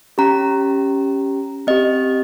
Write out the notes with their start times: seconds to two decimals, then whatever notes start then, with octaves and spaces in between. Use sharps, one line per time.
0.18 C#4 G4 A#5
1.67 C4 G4 D#5